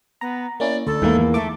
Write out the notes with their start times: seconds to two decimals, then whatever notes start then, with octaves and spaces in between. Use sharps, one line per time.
0.21 B3 A#5
0.60 A#3 C#4 E4 D5
0.87 D2 A4
1.02 E2 G#2 D#3 A3 A#3
1.34 A3 D6